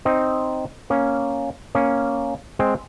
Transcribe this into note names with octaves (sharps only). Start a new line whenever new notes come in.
C4 D#4
A#3 C#4
A#3 C#4
G#3 C4